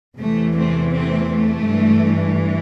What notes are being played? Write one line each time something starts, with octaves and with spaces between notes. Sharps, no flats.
E2 C3 E3 A3
A3 C4
A3 C4
A3
G2 E3